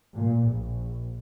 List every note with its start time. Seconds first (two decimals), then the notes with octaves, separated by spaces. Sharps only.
0.15 A#2
0.50 A#1